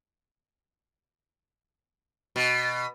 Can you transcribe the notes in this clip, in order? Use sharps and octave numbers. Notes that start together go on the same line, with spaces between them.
B2